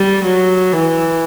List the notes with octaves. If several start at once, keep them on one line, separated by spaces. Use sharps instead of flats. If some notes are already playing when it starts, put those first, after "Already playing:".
Already playing: G3
F#3
E3